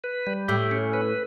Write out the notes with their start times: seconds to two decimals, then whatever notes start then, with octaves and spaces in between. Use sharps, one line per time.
0.04 B4
0.27 G3
0.48 A2 G4
0.71 C#4
0.93 B4